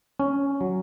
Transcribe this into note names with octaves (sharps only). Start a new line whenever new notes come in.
C#4
F#3